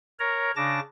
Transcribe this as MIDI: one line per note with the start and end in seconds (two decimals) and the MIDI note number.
0.20 0.51 70
0.20 0.51 73
0.20 0.51 82
0.56 0.80 49
0.56 0.80 62
0.56 0.80 81
0.56 0.80 86
0.56 0.80 94